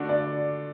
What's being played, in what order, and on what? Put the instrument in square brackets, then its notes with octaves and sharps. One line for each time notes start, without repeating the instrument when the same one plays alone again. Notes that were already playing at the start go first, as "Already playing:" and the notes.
Already playing: [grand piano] D3 A3 D4 F#4
[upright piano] D5